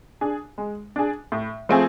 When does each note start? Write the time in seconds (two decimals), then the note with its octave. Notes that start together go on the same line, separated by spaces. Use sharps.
0.21 D4 G#4
0.58 G#3
0.96 D4 G#4
1.32 A2
1.69 F3 A3 C4 G#4